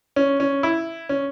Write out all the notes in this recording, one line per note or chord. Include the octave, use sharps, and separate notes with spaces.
C#4
C#4
E4
C#4